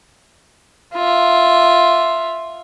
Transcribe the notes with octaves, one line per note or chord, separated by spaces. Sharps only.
F4 E5